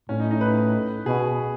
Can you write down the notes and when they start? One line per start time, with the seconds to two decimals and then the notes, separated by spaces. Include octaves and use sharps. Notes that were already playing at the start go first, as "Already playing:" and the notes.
0.09 A2 C#4
0.20 D#4
0.31 D#4
0.41 B4
1.06 B2 G#4